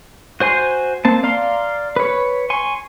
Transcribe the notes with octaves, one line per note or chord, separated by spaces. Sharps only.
F#4 C5 G#5 C6
A#3 C4 A5
D5 F5 A#5 C6
B4 C#5
G#5 C6 C#6